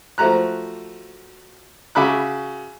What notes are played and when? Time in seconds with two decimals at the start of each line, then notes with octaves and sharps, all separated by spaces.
0.18 F3 A3 F#4 A#5 F#6
1.95 C#3 F#4 E5 B5 D6 F#6